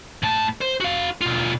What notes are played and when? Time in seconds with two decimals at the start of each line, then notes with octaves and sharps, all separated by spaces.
0.23 A2 A5
0.61 C5
0.80 F#4 F5
1.21 B2 F4